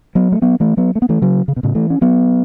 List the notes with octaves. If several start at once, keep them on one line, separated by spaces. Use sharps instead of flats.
F#3 B3
A3
F#3 B3
E3 A3
F#3 B3
A3
B3
E3 A3
C#3 F#3
C#3
B2
A2 C#3
E3 A3
C#4
F#3 B3